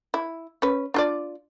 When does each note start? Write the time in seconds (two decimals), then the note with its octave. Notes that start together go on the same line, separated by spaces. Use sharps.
0.14 E4
0.62 C#4 B4
0.94 D4 F4 D5